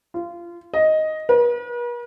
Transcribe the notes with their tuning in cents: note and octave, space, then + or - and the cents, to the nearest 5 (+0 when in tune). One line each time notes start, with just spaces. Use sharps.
F4 -20
D#5 +5
B4 -45